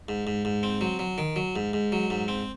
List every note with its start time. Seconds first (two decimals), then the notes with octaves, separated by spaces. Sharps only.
0.09 G#2
0.27 G#2
0.45 G#2
0.63 C4
0.81 F#3
0.99 F#3
1.18 D#3
1.36 F#3
1.56 G#2
1.73 G#2
1.92 F#3
2.10 G#2
2.28 C4